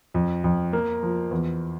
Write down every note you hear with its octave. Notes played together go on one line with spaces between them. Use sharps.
F2
F2
A#3
F3
E2